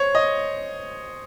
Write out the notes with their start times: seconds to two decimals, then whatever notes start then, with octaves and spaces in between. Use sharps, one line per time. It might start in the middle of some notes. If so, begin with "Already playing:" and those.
Already playing: C5 C#5
0.15 D#5